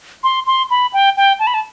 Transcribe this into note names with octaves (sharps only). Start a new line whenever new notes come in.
C6
C6
B5
G5
G5
A5
B5
A5